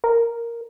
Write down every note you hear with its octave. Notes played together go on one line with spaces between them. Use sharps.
A#4